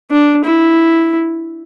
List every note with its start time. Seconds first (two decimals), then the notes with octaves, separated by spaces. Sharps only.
0.11 D4
0.44 E4